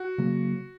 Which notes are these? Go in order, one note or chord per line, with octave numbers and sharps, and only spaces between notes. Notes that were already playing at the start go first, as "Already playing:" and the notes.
Already playing: F#4
C#3 F#3 A#3